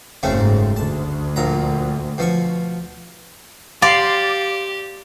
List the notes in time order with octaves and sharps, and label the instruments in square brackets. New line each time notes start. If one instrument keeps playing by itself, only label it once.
[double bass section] F#1 G#2 [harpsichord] C#3 A3 C4
[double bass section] D2 [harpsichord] A5
[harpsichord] A#1 A#2 A#5
B2 F3 C#6
[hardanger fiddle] G4 [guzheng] D5 [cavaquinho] F5 C6